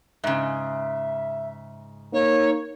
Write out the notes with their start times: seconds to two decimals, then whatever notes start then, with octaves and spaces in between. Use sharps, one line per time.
0.24 G#2 C#3 E5
2.13 A#3 D#4 C#5